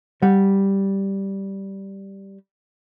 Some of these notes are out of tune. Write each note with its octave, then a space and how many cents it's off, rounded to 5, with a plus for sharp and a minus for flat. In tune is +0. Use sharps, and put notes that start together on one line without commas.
G3 -5 F#5 -10